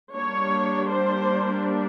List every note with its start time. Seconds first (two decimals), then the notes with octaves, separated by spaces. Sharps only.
0.14 G3 A#3 D4 C#5
0.88 C5